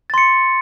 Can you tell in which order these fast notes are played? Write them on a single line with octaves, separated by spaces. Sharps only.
A6 C6 C#7